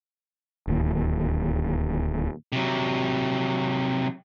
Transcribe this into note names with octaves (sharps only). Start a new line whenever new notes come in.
D1 D#2
C3 F#3